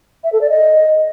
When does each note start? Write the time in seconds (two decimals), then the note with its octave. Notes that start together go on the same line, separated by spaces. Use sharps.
0.24 E5
0.32 A4
0.41 D5
0.50 D#5